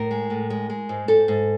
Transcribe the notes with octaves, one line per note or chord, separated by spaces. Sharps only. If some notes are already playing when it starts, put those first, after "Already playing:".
Already playing: A2 A#4
G#3
A2
G#3
G#3
G#2
G#2 A4
G#2